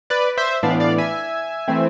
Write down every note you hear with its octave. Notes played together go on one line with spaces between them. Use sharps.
B4 D5
C5 E5
A2 E3 B3 D4 D5 F5
D5 F5
E5 G#5
E3 A3 C4